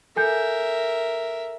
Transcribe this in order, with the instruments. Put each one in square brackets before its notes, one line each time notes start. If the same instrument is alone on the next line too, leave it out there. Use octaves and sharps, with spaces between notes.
[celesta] A4 G#5 G6 [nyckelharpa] A#4 E5